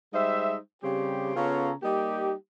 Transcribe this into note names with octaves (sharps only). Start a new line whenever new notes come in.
G3 G#3 D#4 C5 E5
C#3 G3 C4 G4
C#3 B3 C#4 F4 A4 A#5
G3 A#3 D#4 G4